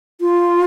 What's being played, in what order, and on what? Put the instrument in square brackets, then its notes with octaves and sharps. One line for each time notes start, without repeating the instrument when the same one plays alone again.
[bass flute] F4